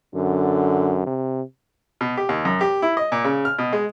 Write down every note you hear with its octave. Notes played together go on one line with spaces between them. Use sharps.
F#2 D3
C3
B2
G4
D#2
F#2
G4
E4
D#5
A#2
C#3
F6
B2
G#3